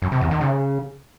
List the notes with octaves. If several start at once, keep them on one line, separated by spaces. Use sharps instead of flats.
F#2
C3
E2
D#3
C#3